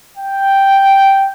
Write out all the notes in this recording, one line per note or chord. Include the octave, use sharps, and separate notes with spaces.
G5